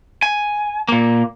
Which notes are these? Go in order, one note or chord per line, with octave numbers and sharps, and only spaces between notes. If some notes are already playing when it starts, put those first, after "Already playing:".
G#5
A#2 A#3